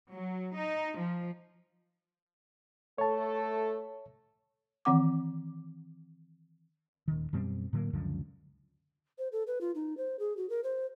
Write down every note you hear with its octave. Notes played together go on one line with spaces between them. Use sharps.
F#3
D#4
F3
A3 A4 C#5 A5
D#3 E3 C4 F#5 D6
D#1 D#3
F#2 B2 G3 C4
A2 D3 F#3 A#3
C#2 F#2 D3 F3
C5
A4
B4
F4
D#4
C5
G#4
F#4
A#4
C5